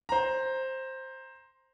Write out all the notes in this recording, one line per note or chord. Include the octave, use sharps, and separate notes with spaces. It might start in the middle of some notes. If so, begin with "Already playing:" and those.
C5 A#5